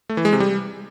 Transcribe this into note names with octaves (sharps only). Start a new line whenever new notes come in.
A3
E3
G#3
C3
G3